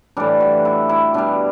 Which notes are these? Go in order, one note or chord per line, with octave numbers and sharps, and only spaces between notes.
A2 E3 G3 D4
F#4
E4
E4
B2 G3 D4